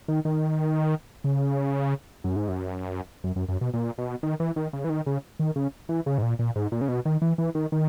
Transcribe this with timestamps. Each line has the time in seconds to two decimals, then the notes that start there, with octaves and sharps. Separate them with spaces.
0.08 D#3
0.25 D#3
1.24 C#3
2.24 F#2
2.36 G#2
2.48 F#2
3.24 F#2
3.36 F#2
3.48 F#2
3.61 B2
3.74 A#2
3.98 B2
4.23 D#3
4.40 E3
4.56 D#3
4.73 C#3
4.84 E3
4.90 D#3
5.06 C#3
5.39 D#3
5.56 C#3
5.89 E3
6.06 C#3
6.18 G#2
6.22 A#2
6.39 A#2
6.56 G#2
6.72 A#2
6.81 C#3
6.88 B2
7.05 D#3
7.22 E3
7.38 E3
7.55 D#3
7.72 D#3